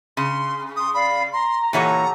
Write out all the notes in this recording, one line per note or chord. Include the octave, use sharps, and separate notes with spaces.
C#3 C6
C6 D#6
D5 F5 B5
A#5 C6
A#2 E3 G4 A4 C#5 F#5 A#5